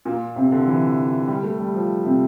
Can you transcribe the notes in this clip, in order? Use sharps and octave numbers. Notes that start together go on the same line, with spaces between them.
A#2
C3
D3
E3
G3
A3
G3
F3
C3